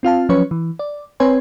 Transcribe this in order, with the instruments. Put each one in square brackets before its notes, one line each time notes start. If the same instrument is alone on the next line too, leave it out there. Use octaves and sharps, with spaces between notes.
[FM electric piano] C4 F4 F5 A5
F3 F#3 C#4 B4 C#5 C#6
E3
D5
C4 B4 C#5 G#5 C6